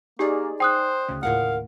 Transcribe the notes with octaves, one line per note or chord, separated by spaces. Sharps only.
A#3 D#4 G4 G#4 D5
C5 G5 D#6 F#6
D2 C#3
D#2 A2 F4 A#4 F5 F#5